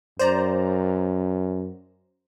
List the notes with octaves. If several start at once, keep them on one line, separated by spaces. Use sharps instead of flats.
F#2 C5 D5 A#5